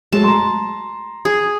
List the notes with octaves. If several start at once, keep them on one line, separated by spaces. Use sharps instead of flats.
F#3 G#3 A3 A5
A#5 C6
G#4